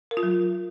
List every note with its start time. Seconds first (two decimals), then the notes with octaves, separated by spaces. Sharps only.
0.11 A#4
0.17 F4
0.23 F#3